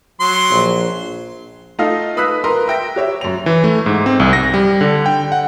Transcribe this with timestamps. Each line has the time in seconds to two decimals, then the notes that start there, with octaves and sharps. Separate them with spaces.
0.20 F#3 C6
0.50 A#1
1.79 A3 D#4 F4 A4 D#5 F5
2.17 B4 B5 D#6 E6 F#6 B6
2.44 A#4 B4 A#5 C6
2.68 E5 G5 A#6
2.96 G4 C#5 E5
3.21 F#2 F7
3.46 E3
3.64 A3
3.86 G#2
4.06 C4
4.20 C2
4.33 A#6
4.54 G3
4.81 D3
5.06 G5
5.32 F#5